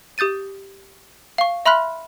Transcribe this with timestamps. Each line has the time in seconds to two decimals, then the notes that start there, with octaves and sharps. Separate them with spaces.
0.18 G4 D#6 G6 A6 D#7
1.38 F5 C#6
1.66 E5 B5 C6 F6 F#6 B6